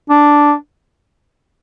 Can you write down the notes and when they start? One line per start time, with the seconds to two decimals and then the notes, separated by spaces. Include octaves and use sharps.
0.10 D4